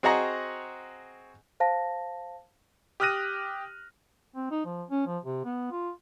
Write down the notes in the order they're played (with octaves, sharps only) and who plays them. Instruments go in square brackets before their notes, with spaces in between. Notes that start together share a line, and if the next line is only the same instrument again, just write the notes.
[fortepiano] C4 F#4 G#4 D#5 F#5 A#5
[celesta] C5 F5 A5 A#6
[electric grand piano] G4 D#6 F6 F#6 A#6 D#7
[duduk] C4
D#4
F3
C#4
F3
C3
B3
F4